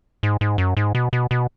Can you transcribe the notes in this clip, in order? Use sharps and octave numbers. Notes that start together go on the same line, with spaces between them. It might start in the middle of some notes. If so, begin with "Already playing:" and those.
G#2
G#2
F#2
G#2
B2
B2
B2